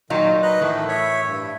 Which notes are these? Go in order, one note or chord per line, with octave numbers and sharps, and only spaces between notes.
A#2 D#3 F#3 D#4 F4
B4 D#5 F#6
A2 D#3 E3 A3
C#5 E5
G2